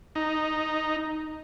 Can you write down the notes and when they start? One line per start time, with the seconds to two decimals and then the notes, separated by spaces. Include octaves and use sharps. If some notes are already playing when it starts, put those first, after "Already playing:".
0.15 D#4